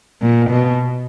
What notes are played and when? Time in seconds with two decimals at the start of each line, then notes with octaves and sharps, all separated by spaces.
0.22 A#2
0.50 B2